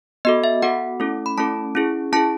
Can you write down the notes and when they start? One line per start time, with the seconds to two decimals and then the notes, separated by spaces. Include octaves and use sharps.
0.25 B3 F#4 A4 D#5
0.44 E5
0.62 B3 F#4 A4 F#5
1.00 A3 C#4 E4 A4
1.26 B5
1.38 A3 C#4 E4 A4 A5
1.75 C#4 E4 G#4
2.13 C#4 E4 G#4 A5